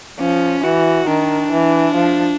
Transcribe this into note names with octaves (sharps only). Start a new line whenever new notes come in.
F3 C#4
E3 F#4
D#3 D4
E3
F3